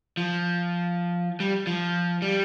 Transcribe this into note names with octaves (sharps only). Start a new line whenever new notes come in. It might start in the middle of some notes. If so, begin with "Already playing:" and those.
F3
G3
F3
G3